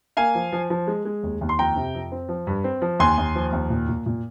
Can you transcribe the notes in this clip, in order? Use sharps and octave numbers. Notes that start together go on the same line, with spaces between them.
A#3 F5 G#5
F3
F3
F3
G#3
G#3
D#2
D#2
C6
F2 G5 A#5
C3
F2
C4
F3
G2
C4
F3
D#2 G#5 C6
D#2
F3
D#2
A#2
A#2
A#2